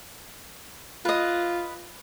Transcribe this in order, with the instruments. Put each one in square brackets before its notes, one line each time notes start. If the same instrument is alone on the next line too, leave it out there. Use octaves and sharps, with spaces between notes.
[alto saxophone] F4 [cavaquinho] B4 D#5